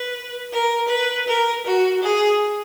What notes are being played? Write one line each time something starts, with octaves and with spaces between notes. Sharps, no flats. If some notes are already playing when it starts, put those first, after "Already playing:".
Already playing: B4
A#4
B4
A#4
F#4
G#4